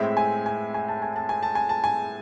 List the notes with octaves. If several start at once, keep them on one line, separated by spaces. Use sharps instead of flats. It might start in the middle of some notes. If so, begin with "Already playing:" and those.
Already playing: A2 G#3 C4 E5
G#5
G#5
G#5
A5
G#5
A5
G#5
A5
G#5
A5
G#5